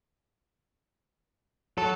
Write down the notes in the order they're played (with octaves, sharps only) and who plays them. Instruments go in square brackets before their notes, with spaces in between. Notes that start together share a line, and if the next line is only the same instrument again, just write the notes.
[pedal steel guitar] F#3 [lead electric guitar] A4